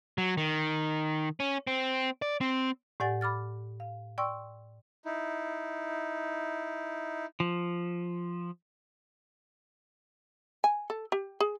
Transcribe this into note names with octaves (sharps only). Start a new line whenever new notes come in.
F#3
D#3
C#4
C4
D5
C4
A2 G4 D5 F#5 G#5 A6
B5 D6 F6 A6
F5
D5 G5 C6 C#6 E6
D#4 E4
F3
G#5
A4
G4
G#4